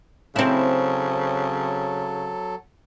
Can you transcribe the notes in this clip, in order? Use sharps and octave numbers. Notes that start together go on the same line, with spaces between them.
C#3 F#3 C4 E4 A4